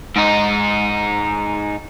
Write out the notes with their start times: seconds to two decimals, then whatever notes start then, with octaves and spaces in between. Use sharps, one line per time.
0.16 G#2 D#4